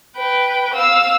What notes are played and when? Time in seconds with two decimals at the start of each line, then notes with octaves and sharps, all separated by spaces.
0.17 B4 G5
0.74 F5 E6